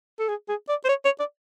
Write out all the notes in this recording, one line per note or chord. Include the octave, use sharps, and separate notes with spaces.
A4
G#4
G#4
D5
C5
C#5
C#5
D5